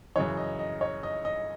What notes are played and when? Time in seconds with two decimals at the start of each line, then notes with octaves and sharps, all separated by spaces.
0.16 F#2 C#3 E3 C#5
0.37 D#5
0.59 D#5
0.81 C#5
1.03 D#5
1.25 D#5